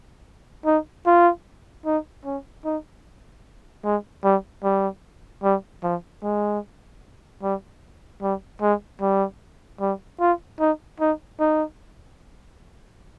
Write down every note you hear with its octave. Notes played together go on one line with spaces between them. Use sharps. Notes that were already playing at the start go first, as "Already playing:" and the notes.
D#4
F4
D#4
C#4
D#4
G#3
G3
G3
G3
F3
G#3
G3
G3
G#3
G3
G3
F4
D#4
D#4
D#4